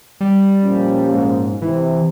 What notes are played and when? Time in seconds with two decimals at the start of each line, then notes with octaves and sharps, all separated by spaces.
0.21 G3
0.63 A#2 F3 C#4
1.13 G#2
1.62 C3 E3